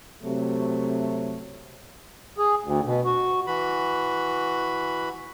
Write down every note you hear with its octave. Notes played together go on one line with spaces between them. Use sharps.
C3 F#3 A3
G#4
D2
B2
F#4
E3 F#4 B5